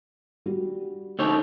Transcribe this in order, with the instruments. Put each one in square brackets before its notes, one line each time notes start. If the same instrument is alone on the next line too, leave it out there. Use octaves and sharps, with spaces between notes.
[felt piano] G3 F#4
[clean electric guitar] D3 D#4 C#5